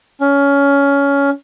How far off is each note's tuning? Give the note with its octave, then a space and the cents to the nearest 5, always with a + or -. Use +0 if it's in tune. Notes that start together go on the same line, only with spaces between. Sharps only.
C#4 +20